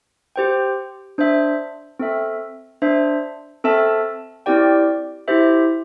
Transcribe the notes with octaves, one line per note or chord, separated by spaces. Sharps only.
G4 C5 G5
D4 C5 E5
C4 A4 E5
D4 C5 E5
C4 A4 E5 A5
C4 E4 G4 D5 G5
E4 G4 C5 E5